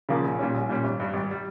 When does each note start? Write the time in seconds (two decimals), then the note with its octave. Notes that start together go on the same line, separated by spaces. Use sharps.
0.09 C#3 F3 A#3
0.25 A#1
0.39 A#2 G3 C#4
0.55 A#1
0.69 A#2 G3 C#4
0.84 G#1
1.00 G2 G3
1.14 G#1
1.31 G3